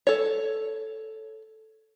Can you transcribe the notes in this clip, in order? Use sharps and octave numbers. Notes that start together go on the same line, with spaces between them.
A4 C#5